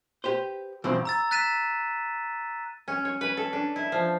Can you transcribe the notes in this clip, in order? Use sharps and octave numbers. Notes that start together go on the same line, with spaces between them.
G4 B4 C5
G2 B2 E3 F3 C4
A#5 E6 A6
F#6 A6 B6 D#7 E7
C#4
C#5
B4
A4
D4
E4
F3